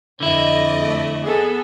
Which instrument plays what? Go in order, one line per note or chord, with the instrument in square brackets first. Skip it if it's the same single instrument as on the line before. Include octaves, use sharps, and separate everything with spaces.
[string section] F2 D5 D#5 [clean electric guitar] D3 E4
[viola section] A3
B3 G#4 A4